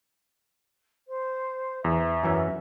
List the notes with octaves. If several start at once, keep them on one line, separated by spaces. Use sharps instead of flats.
C5
E2 E5
F#2 E3 C#4